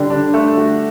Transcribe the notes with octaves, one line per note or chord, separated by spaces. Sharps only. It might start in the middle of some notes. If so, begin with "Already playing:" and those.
Already playing: D3 G3
D4
A3
F#4